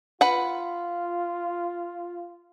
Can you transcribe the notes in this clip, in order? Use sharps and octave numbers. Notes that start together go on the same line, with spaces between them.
F4 B4 F#5